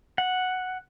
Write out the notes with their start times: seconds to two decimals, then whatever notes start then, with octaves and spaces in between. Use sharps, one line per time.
0.18 F#5